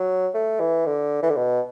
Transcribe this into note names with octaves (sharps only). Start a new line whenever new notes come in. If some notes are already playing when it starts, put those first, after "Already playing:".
Already playing: F#3
A3
E3
D3
E3
D3
B2